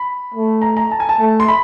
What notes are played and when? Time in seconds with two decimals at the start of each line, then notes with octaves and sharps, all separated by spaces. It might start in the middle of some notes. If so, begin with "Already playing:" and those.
Already playing: B5
0.34 A3
0.62 A#5
0.77 A#5
0.91 A5
1.00 G#5
1.09 A5
1.19 A3
1.40 C6
1.48 B5